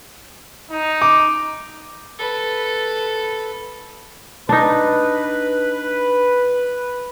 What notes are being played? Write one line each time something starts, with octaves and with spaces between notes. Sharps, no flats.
D#4
D6
A4 B4
D4 D#4 B4